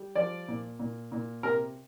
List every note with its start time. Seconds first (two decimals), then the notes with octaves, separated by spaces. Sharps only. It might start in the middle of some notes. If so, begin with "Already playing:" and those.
Already playing: G3
0.15 F3 D5
0.48 A#2
0.80 A#2
1.12 A#2
1.43 C3 A#4